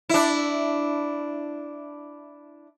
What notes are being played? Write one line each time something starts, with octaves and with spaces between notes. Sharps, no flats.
D4 E4